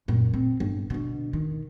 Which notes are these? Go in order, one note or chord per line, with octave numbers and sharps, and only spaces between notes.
F#2 A#2
C4
G1
B2 D3
D#3